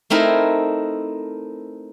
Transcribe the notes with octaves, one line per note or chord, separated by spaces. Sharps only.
A3 C4 D#4 E4 A#4